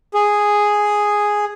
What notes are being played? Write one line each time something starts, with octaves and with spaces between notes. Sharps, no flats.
G#4